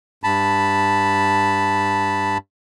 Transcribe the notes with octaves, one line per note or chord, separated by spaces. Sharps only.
G2 A5 B5